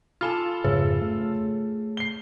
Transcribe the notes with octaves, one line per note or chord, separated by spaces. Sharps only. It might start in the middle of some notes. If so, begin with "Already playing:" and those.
F4 A4 G#5 B5 F6
F2 G#2 C#3 G#4 C#5
A3
C7 G7